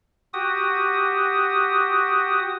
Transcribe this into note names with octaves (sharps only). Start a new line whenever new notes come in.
F#4 G4 D#6